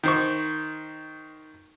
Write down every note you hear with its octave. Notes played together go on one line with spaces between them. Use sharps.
D#3 C5 C#6